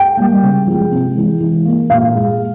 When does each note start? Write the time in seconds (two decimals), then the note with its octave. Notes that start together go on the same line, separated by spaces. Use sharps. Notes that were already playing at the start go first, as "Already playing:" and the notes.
Already playing: G5
0.17 G3 A#3
0.43 C#3
0.67 F3 G#3
0.92 C3
1.16 E3 G#3
1.40 E3
1.65 A#3
1.90 A#2 F5
2.15 G#3